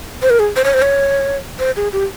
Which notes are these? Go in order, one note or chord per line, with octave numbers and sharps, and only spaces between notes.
C5
A#4
G#4
C5
C#5
C5
C#5
C5
G#4
G4